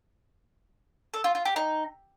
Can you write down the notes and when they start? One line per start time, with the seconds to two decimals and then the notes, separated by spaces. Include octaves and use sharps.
1.14 A4
1.24 F4
1.35 F4
1.45 G4
1.56 D#4